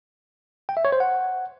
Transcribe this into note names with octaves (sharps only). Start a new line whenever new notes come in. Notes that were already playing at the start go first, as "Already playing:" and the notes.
G5
E5
C#5
C5
F#5